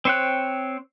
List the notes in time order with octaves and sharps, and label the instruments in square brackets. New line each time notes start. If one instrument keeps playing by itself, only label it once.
[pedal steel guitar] C4 C5 C#5 G5 F#6